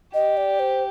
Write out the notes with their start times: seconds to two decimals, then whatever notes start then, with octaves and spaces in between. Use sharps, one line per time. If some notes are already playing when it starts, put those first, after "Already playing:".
0.14 G4 D#5
0.37 D5
0.59 C5